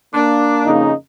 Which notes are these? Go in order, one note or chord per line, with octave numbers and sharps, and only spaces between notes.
A#3 D4
F2 C#3 D#4